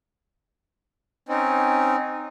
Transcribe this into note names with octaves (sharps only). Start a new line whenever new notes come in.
C4 C#4 D#4